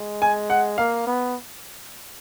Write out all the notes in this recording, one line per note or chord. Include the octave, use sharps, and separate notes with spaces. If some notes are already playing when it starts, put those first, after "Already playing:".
Already playing: G#3
G#5
F#5
A#3 F5
B3